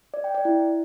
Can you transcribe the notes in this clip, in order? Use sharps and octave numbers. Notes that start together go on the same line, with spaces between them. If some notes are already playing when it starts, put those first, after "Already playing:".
D5
G5
D5
E4